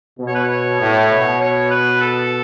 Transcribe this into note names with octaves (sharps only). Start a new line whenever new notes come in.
B2
C#5
B4
C#5
A2
B2
C#5
B4
A4